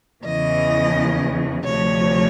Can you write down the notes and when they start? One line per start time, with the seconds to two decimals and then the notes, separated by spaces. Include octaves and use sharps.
0.24 E2 C#3 E3 D#5
1.64 D2 C3 F3 C#5